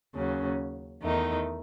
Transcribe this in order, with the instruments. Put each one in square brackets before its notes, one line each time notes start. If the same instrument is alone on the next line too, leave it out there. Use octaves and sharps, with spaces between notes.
[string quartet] D#2 C#3 F#3 C#4
E2 D#3 A3 D#4